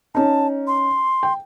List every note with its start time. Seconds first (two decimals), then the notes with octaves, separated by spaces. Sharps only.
0.15 C#4 D#4 A5
0.67 C6
1.23 G5